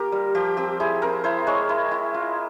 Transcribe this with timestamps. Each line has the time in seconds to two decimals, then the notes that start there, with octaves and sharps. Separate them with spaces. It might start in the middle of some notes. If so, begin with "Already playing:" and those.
Already playing: A#3 F4 G4 A#4
0.12 G3
0.35 F3 G4
0.57 C4 G4
0.80 E4 G#4
1.02 C4 A#4
1.24 E4 C5
1.47 G#3 C#5
1.69 E4
1.91 E4
2.14 F4